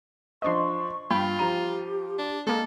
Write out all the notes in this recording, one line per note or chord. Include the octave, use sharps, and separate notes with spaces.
F3 D4 C5 D#5 C6 C#6
G2 F4 G5 B5
F3 G4 A#5 D#7
D4
G#3 A#3 A4 A5